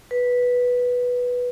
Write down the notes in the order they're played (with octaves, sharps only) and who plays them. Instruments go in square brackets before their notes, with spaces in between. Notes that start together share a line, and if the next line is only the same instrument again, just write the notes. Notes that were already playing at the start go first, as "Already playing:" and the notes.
[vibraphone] B4